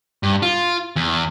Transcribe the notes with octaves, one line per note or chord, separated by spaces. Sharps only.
G2
F4
E2